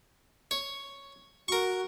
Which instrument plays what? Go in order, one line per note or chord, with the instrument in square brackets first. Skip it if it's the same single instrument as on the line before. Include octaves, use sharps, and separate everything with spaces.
[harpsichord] C#5
[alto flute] F#4 [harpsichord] A#4 C#6